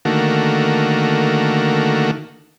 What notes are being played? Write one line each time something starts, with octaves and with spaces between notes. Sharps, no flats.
D3 D#3 A3 A#3 F#4